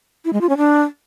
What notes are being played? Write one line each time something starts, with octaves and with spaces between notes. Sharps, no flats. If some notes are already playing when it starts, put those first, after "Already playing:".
E4
G#3
F4
C#4
D4